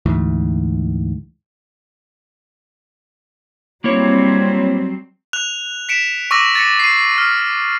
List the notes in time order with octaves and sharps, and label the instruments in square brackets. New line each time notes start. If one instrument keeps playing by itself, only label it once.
[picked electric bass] D2 G#2 E3
[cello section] F#3 G3 C4 [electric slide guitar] A#3 E4 C#5
[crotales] F#6 F7
B6 C#7 D7 E7
C#6 D6 E6 A#6 D#7
A6 A#6 C#7
C7 D#7
F6